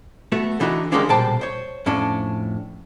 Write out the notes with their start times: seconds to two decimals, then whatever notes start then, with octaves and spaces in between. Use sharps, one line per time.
0.32 A3 B3 F#4
0.60 D3 E3 D4 D#4 F#4
0.92 D3 G3 G#3 A#3 C#4 D4
1.09 B1 A#2 G3 C5 G5 A5
1.41 C5 C#5
1.86 F2 A2 C#4 D4